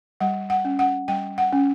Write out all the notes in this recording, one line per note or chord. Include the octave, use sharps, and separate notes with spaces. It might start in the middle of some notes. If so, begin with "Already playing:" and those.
G3 F#5
F#5
C#4
F#5
G3 G5
F#5
C#4